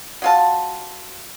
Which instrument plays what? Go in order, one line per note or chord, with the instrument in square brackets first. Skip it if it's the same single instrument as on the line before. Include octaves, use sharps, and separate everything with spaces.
[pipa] F#3 F4 A5